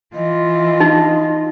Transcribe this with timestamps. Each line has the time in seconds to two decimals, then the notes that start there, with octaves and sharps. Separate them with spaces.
0.14 E3 F4 D#5
0.80 D#4